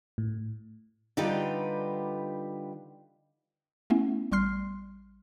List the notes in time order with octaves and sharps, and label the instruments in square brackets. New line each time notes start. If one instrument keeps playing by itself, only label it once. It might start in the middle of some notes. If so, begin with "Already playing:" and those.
[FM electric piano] A2
[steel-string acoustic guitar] D3 G3 D#4 F4 G4 B4
[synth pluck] A3 B3 C#4 E4
A1 G3 C6 F6 C7